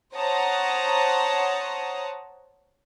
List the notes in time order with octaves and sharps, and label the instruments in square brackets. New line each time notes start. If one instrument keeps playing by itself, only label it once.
[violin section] C5 C#5 F#5 A5 A#5 D#6